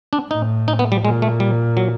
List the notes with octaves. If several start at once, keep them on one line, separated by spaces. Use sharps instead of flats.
D4
A2 D#4
D#4
B3
G3
A#2 G#3
A3
G3
F#3